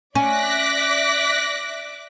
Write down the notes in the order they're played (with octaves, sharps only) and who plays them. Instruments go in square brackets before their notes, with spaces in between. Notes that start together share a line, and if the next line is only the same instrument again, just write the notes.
[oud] C#4 [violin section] D5 E5 D6 [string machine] F#6 A#6 B6